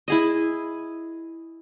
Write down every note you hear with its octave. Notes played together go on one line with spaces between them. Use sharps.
E4 G#4 D#5